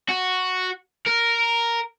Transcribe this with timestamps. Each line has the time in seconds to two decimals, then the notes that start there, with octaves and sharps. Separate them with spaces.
0.09 F#4
1.06 A#4